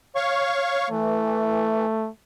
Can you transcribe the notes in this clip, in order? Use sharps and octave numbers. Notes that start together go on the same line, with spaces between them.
C#5 F5 C#6
E3 A3